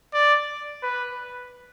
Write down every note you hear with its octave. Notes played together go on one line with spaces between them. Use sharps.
D5
B4